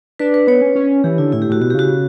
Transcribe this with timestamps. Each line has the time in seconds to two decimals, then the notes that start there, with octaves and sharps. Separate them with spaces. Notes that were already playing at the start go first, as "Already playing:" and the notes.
0.19 D4 B4
0.34 B4
0.47 B3 C#5
0.62 C#4
0.75 C#4
1.04 E3 G4
1.18 D3 E4
1.32 A2 E4
1.42 G4
1.49 A2 F#4
1.61 B2 F#4
1.70 G4
1.75 C#3 F#4